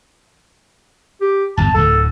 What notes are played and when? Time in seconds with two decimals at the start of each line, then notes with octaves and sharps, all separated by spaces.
1.21 G4
1.57 G1 E2 G2 A5
1.74 D1 D2 A2 A4